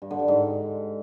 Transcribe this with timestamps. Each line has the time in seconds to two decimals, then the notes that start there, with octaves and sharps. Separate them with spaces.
0.02 G2
0.11 D3
0.19 G3
0.28 G#2